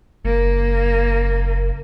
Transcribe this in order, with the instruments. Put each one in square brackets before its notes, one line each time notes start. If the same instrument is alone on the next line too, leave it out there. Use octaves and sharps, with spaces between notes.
[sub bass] F#1 [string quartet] A#3